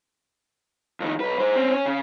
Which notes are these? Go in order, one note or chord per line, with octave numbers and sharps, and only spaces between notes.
F2 D#3
B1 B4
G#4 C5
C4 C#4
C#4
C#3